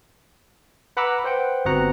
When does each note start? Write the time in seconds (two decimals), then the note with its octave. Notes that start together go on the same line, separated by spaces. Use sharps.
0.97 B4 F#5 A#5 B5 D6 E6
1.24 B4 C5 F#5 G5
1.65 G1 B3 C4 F#4 F#5 A#5